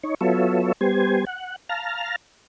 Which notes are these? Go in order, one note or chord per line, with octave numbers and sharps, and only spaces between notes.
D#4 C#5
F#3 B3 F4 A4 C#5 E5
G3 B3 G4 C5 G#5
F#5
F5 A5 A#5 F6